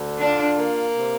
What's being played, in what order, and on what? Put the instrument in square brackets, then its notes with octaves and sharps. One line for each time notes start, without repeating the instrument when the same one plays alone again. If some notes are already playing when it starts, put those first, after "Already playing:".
Already playing: [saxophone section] D2 D3
[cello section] D4 [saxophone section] F4
[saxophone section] A#3
C3